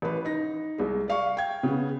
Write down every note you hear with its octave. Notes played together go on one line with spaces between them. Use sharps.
A1 B4
D#4 A#6
C2 G#3
D5 F5 C#6
G5 G#6
C#3 B3